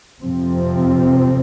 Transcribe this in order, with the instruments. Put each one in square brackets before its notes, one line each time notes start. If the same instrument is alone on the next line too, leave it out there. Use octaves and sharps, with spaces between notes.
[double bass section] F2 C3 F3 C4